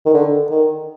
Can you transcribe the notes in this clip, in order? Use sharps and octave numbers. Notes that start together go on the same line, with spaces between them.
D#3
D3
D#3